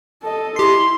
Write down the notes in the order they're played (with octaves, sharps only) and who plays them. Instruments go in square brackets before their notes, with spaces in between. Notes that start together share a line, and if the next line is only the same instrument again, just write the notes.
[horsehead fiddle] A4 D#5
[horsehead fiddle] E4 [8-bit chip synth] G4 C7 [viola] C6